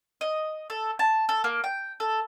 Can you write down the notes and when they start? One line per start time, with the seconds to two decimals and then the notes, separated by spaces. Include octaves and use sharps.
0.21 D#5
0.70 A4
0.99 A5
1.29 A4
1.44 A#3
1.64 G5
2.00 A4